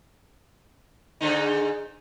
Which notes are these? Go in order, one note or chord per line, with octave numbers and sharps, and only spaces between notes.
G#2 D3 D#4